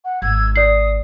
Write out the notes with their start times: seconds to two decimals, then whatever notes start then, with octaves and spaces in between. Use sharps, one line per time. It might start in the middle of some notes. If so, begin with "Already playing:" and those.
0.03 F#5
0.22 G#1 E6 G#6
0.56 D5 D#6 C7